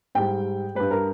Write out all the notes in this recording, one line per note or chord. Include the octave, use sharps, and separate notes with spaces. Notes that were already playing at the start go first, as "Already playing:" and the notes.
G#2 G3 G5
G2 G3 B4
A#4